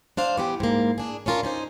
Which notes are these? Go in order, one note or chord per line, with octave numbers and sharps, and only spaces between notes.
D4 C5 F5
E3 B3 G4
G#2 A#3
D4 G#4
C#4 D4 F4 A4 A#4
C#4 D#4 C5